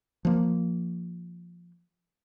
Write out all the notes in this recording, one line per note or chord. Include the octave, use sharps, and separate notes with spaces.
F3 A#3